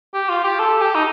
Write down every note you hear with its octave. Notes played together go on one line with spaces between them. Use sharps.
G4
F4
G4
A4
G4
D#4